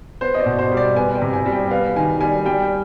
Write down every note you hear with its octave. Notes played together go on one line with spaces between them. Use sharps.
B3 C5
D#5
D5
B2
C5
G3
D5
B3 G#5
G5
C3
G#5
G3
G5
B3 F5
D#3 G#5
G3 G#5
G3 G5